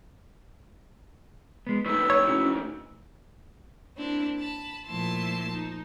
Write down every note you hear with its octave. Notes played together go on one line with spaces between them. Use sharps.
G#3 B3
A2 D#3 B4 E6
C#5
C#4 E4 F#4
A#3 C4 D4 E4
A5 B5
A#2 F3 A3 E4 A5 C6
F3 D#4